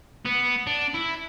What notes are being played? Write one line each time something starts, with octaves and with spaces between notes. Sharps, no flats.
B3
D4
E4